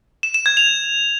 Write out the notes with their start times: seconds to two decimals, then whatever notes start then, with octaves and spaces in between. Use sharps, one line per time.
0.23 E7
0.34 E7
0.46 G#6
0.57 F7